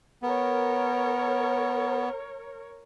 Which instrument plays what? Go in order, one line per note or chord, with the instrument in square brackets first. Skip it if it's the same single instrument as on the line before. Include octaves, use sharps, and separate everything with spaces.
[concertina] B3 [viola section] A#4 C#5